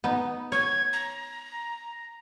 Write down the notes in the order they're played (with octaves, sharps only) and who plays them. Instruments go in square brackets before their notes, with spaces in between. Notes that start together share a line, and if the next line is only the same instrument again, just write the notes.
[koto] B3 D#4
[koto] C#5 [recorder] G#6
[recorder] A#5